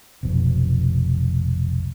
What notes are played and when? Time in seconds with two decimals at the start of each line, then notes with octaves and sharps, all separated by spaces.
0.23 F1 B1 B2